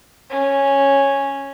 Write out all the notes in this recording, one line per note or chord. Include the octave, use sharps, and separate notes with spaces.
C#4